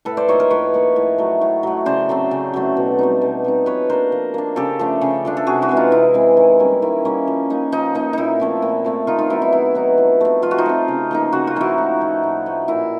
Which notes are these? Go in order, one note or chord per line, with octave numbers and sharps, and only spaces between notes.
A2 A4 B4
C5 D5
F3 A#3 D#4 C#5 D#5
A#4 C5
A2 B4 C#5
F3 A#3 D#4
A2
F#3 A3
A2
F#3 A3
C#3 C5 D5
F#3 A3 C4
C#3
F#3 A3 C4
B2
G3 C4 D#4
B2
G3 C4 D#4
F3 B4 C#5
A#3 D4 A#4 C5
F3
A#3 D4
C#3 G4 A4
F3 A3 D4
C#3
F3 A3 D4
A4
C3 F#4 G#4
E4 F#4
E3 G#3 C4
D#4 F4
C3 E4
E3 G#3 C4
D#3
G3 A#3 C#4
D#3 E4
G3 A#3 C#4
F3
A#3 D#4
F3 D#4
A#3 D#4
A#2 D#4 E4
F3 A3 C4
A#2
F3 A3 C4
D#3 D#4 F4
D#4 F4
F#3 B3 D#4 E4
E4
D#3 E4
F#3 B3 D#4
F3
A3 C4
F3 F4
F#4
D#4 F4
A3 C4
C#3
F3 A#3 D#4
C#3 F#4
F4
F3 A#3 D#4 E4 F#4
A2
F3 A3
A2
F3 A3
A#2 E4